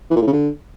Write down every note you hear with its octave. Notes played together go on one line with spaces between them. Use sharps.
E3
A#2
A2
C#3
D3